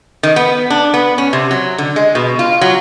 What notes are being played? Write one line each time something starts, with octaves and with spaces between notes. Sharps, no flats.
D#3
B3
D4
B3
C#4
C3
F#3
D3
G#3
B2
F4
F#3